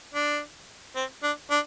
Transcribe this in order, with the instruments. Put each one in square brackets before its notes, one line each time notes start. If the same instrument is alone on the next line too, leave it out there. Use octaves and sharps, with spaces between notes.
[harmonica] D4
C4
D4
D4